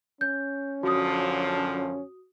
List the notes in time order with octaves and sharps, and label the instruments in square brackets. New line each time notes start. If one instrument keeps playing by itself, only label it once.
[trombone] C#4 [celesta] G6
[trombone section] F#2 D3 F3 [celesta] F#4 D#6